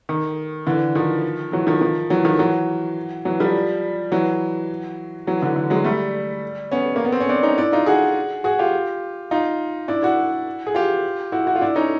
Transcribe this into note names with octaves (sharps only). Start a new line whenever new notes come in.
D#3
D3 E3
D#3 F3
E3 F#3
D#3 F3
D#3 F3
E3 F#3
D#3 F3
E3 F#3
E3 F#3
F3 G3
E3 F#3
E3 F#3
D3 E3
D3
F#3 G#3
G3 A3
B3 C#4
A#3
B3
C4
C#4
C4 D4
C#4 D#4
D4 E4
D#4 F4
F#4 G#4
F#4 G#4
F4 G4
D#4 F4
D4 E4
E4 F#4
G#4
F4 G4
E4 F#4
E4 F#4
F4
D4 E4
C#4 D#4